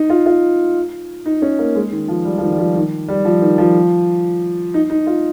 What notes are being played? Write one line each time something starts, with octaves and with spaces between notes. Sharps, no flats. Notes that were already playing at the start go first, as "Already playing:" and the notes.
Already playing: D#4
F4
F4
D#4
C#4
A#3
G#3
D#3
F3
G3
F3
D#3
G3
F3
D#3
G3
F3
D#3
F3
D#4
D#4
F4